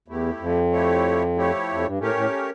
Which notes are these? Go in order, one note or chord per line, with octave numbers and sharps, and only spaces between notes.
E2 A3 E4 G4
F2
F3 A3 E4 G4 C#5
F3 A3 E4 G4 C#5
F2
G2
A2 A3 C#4 G4 A#4 C#5
A2